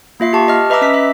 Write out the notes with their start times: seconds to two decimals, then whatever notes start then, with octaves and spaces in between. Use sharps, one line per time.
0.20 A#3 F4 E5 C7
0.33 G4 A5 C#6
0.48 D#5 A5 F6
0.70 B4 D#5 E5 A#5 D6 E6
0.81 C#4 D#5 B6
0.94 E5